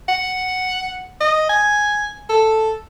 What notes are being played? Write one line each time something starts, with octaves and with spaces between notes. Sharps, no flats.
F#5
D#5
G#5
A4